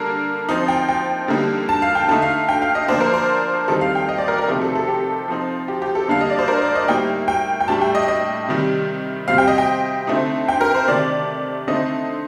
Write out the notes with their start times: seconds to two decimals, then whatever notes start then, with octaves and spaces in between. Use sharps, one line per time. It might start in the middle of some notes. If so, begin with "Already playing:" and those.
Already playing: D3 G3 A#3 D4 A#4
0.49 F3 C4 D#4
0.68 G5
0.89 G5
1.28 D3 G3 A#3 D#4
1.69 A5
1.82 F5
1.95 G5
2.08 D3 A3 D#4 A5
2.22 F5
2.49 G5
2.62 F5
2.75 D#5
2.88 F3 A#3 D4 C5
3.01 A#4
3.14 C5
3.68 D#3 G3 C4 D#4 A4
3.81 F5
3.95 G5
4.09 D#5
4.18 D5
4.28 A#4
4.38 A#4
4.48 C3 F3 A3 D#4 G4
4.62 A4
4.75 A4
4.88 G4
5.28 F3 C4 D#4
5.68 G4
5.82 G4
5.95 A4
6.08 D3 G3 A#3 D4 F5
6.21 D#5
6.30 D5
6.39 C5
6.48 A#4
6.62 D5
6.75 D#5
6.88 A2 G3 A#3 D#4 G5
7.28 G5
7.61 G5
7.68 A2 G3 D4 A5
7.81 G5
7.95 D#5
8.08 D#5
8.48 C3 D#3 G3
9.28 C3 G3 C4 F5
9.38 G5
9.48 D#5
9.58 G5
10.07 D3 A3 C4 D#4
10.48 G5
10.61 A#4
10.75 C5
10.88 C3 D#3 A3 D5
11.68 D3 A3 C4 D#4 D#5